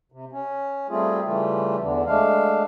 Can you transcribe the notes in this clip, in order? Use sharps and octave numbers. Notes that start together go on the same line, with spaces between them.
C3
C#4
G3 A3 C4 F4 G#4
C#3 E3 G3 A3 F4
E2 D3
G#3 A3 D4 F5